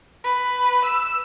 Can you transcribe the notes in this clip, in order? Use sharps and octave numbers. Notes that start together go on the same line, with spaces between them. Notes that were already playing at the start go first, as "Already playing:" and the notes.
B4
E6